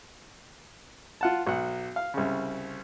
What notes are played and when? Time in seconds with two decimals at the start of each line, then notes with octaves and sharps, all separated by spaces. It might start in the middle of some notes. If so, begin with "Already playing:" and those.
1.21 F4 F#5 A5
1.47 B1 F#5
1.96 F5
2.14 C2 C#3